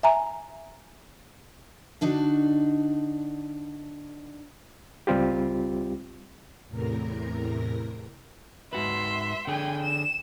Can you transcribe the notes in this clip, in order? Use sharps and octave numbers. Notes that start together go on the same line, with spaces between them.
E5 G#5 A#5
D3 D4 D#4 F#4
C#2 G3 C4 F4 G4
E2 A2 C3 A#4 A#5
G#2 F#4 B4 E5 C6
D3 G#4 G5 G#5
E7